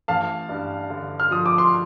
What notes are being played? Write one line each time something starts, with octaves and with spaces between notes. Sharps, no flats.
A1 F5 A5
G2
D3
F6
F3 D#6
D6
C6